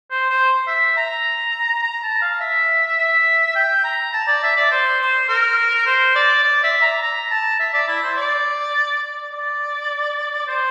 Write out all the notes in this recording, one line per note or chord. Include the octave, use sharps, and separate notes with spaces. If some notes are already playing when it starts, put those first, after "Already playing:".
C5
C5
E5
A#5
A#5
A5
F5
E5
E5
G5
A#5
A5
D5
E5
D5
C5
C5
A#4
C5
D5
D5
E5
A#5
A#5
A5
E5
D5
E4
C5
D5
D5
C5